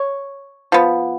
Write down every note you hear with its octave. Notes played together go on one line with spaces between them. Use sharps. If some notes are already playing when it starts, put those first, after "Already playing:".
Already playing: C#5
F3 B3